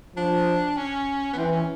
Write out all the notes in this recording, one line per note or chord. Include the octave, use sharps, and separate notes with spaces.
F3 D4
C#4
B3
E3 C4
C#4